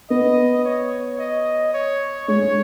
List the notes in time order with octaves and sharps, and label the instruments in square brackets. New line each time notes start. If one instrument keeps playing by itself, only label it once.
[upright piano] B3 [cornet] D#5
[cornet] C#5
D#5
C#5
[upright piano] G#3 [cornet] C#5
[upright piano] G#3